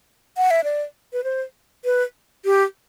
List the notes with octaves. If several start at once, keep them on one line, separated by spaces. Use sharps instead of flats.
F#5
E5
D5
B4
C5
B4
G4